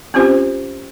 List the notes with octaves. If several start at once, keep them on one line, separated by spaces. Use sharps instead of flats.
C4 C#4 F4 G4 C5